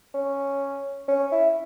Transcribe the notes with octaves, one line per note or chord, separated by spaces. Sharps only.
C#4
C#4
E4